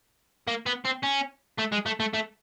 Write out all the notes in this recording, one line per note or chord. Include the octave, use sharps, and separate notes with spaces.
A#3
B3
C4
C#4
A3
G#3
A3
A3
A3